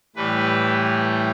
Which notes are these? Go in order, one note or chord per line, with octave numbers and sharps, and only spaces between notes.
A2 E3 G3 B4